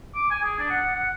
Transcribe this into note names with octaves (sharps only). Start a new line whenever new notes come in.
D6
G#5
G#4
D4
F#5
F#5